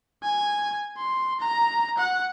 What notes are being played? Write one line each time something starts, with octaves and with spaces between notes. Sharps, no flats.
G#5
C6
A#5
F#5